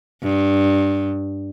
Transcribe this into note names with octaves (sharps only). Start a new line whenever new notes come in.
G2